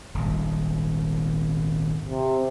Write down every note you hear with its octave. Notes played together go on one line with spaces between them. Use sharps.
D#1 G#1
C3